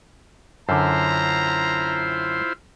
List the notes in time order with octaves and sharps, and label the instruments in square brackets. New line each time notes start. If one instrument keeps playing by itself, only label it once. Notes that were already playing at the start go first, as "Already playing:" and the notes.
[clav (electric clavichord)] F#2 D3 [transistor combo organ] E4 F4 C5 [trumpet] A#5